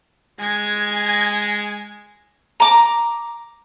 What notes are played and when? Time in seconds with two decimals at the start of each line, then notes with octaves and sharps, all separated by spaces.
0.40 G#3 G#5 G#6
2.60 A#5 D6